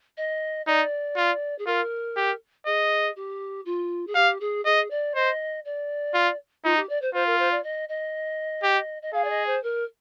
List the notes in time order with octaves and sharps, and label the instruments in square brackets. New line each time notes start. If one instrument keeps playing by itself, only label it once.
[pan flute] D#5
[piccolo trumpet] D#4 [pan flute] D5
[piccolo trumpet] F4
[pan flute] G#4
[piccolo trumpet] F4 [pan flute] A#4
[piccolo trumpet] G4
[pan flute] G#4 [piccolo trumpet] D#5
[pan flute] G4
F4
G#4
[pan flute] G4 [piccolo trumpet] F5
[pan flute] G#4
[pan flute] G#4 [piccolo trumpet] D#5
[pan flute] D5
[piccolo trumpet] C5 [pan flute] D#5
[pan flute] D5
[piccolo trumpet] F4
[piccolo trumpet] D#4 [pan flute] F4
[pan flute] G4
D5
C5
[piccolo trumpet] F4 [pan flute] C5
[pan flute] A#4
C5
D5
D#5
D#5
[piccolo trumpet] G4
[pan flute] D#5
[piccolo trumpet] G#4 [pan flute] F5
[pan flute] D5
D#5
C5
A#4